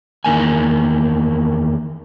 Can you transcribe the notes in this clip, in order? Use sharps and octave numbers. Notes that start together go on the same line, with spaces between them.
E2 D#3 A#3 G#5